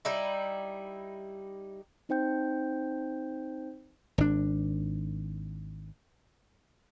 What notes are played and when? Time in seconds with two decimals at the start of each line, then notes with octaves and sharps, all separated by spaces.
0.05 G3 D#4 E4
2.09 C4 D#4 C5 G5 G6
4.18 G#1 D4